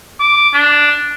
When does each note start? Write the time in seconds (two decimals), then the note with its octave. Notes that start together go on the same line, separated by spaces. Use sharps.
0.20 D6
0.53 D4